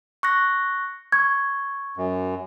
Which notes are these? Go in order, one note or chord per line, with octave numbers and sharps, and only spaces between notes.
C#6 F#6 A#6
C#6 G#6
F#2